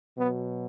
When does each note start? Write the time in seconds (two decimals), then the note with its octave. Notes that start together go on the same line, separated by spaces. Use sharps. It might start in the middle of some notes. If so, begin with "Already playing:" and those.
0.18 B2 F#3 B3